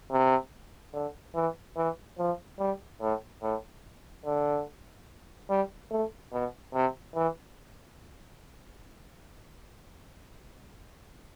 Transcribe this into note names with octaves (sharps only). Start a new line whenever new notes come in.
C3
D3
E3
E3
F3
G3
A2
A2
D3
G3
A3
B2
C3
E3